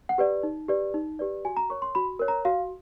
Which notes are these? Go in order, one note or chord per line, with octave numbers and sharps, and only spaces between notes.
F#5
G4 B4 D5
D#4
G4 B4 D5
D#4
G4 B4 D5
F#4 G#5
A#5
A#4 C#5 C#6
C6
F#4 B5
A#4 C#5
A#5
F#4 F5